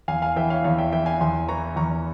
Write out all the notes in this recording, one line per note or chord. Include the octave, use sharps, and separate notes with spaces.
E2 F5 G#5
F5 G#5
E3 E5 G5
C#5 F5
E2 C#5 F5
E5 G5
E3 E5 G5
F5 G#5
E2 G#5 C6
E3 A#5 C#6
E2 A#5 C#6